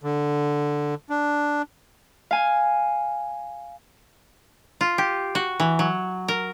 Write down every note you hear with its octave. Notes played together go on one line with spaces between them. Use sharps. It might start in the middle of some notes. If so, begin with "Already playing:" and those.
D3
D4
F5 G#5
F4
G4
F#4
E3
F#3
A#4